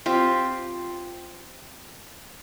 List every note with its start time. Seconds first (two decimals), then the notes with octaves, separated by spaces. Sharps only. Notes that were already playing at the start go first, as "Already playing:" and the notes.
0.06 C4 F4 G4